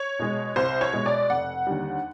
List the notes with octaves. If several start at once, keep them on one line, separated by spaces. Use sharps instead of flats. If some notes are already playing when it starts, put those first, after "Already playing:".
Already playing: C#5
B2 G#3
C2 C5
C#5
B2 G#3
D5
F1 F#5
D#2 D3 G3